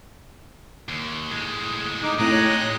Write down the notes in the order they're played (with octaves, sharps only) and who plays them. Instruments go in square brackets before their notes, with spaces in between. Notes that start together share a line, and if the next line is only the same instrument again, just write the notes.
[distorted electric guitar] D#2
A2 G#3
[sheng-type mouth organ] D#4 D6
[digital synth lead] A2 [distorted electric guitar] G#3 G4 [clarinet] C4 [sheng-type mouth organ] A#5 D#6 F#6
[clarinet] C#5